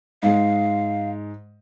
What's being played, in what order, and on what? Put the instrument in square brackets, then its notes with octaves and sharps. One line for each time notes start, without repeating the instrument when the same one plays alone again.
[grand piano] G#2 G#3 [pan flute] F5